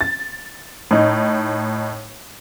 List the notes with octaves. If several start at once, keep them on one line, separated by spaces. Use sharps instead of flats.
A6
A2 D#4